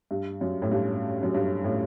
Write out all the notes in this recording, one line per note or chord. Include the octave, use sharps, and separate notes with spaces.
G2
F#2
A2
G2
F#2
G2
A2